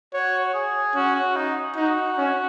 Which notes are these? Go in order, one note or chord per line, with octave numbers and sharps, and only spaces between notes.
F#4 C#5
G#4
C#4 F#4
F#4
D#4
D#4 F#4
C#4